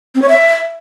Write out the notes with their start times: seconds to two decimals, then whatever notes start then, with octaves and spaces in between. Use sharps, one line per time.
0.15 C4
0.22 C#5
0.29 E5